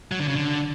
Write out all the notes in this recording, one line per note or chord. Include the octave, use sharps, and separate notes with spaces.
F#3
D3
C#3
D3